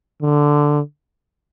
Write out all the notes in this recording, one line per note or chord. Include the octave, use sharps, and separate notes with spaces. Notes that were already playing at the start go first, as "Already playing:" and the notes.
D3